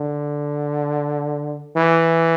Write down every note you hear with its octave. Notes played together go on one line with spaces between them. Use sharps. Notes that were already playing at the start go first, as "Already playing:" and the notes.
Already playing: D3
E3